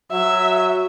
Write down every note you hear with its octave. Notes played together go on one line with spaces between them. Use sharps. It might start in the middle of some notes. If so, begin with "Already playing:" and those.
F#3 E5